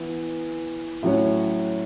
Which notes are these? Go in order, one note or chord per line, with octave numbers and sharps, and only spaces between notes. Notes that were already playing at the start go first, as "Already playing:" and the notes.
Already playing: E3 B3
A2 F#3 C#4 F#4 C#5